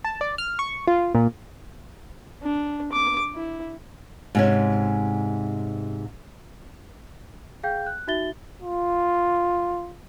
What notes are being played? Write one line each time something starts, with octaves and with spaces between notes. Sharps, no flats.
A5
D5
F6
C#6
F4
A#2
D4
D6
E4
G#2 C3 C#4
G#4 F5 G5 G6
F#6
D#4 F#4 E5 A6 G7
F4